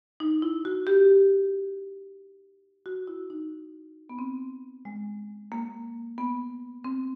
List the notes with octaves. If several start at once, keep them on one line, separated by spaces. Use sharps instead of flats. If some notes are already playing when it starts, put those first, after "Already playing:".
D#4
E4
F#4
G4
F#4
E4
D#4
B3
C4
G#3
A#3
B3
C4